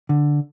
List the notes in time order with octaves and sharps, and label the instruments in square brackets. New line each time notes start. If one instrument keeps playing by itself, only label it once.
[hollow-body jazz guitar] D3